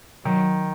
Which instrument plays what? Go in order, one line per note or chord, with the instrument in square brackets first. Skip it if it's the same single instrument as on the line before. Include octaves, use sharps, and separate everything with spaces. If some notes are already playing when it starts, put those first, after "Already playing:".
[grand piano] D#3 [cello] F#3